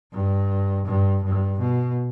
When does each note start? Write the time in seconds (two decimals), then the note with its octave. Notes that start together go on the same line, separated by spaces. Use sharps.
0.13 G2
0.86 G2
1.23 G2
1.60 B2